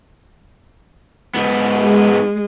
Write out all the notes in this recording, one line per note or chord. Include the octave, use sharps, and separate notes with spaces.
G#2 B3
G#3